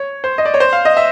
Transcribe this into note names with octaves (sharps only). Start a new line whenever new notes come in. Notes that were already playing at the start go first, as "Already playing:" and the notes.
Already playing: C#5
C5
D#5
D5
C#5
C5
F5
D#5
E5